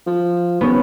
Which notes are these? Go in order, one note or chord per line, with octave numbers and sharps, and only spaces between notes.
F3
D#2 B3 C#4